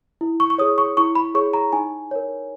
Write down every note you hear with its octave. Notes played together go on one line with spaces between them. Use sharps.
E4
C#6
C#6
G#4 C#5 D#6
C#6
E4 C#6
B5
G#4 C#5 C#6
A#5
D#4 G#5
A#4 C#5